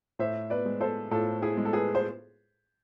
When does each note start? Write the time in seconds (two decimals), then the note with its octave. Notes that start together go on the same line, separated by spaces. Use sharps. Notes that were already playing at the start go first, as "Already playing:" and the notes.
0.19 A2 C5 E5
0.50 B4 D5
0.65 G#3
0.80 A4 C5
1.11 A2 F4 A4
1.42 E4 G#4
1.57 G#3
1.65 A4
1.73 G#4 B4
1.95 C5